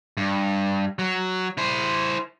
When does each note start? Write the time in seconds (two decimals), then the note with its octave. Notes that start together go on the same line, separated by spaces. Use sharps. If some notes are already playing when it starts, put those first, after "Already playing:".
0.17 G2
0.99 F#3
1.58 E4 C5